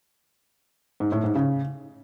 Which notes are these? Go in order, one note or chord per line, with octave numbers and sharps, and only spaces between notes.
G#2
A2
G#2
C#3